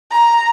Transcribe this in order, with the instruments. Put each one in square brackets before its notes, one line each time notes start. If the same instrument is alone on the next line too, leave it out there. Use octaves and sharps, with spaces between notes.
[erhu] A#5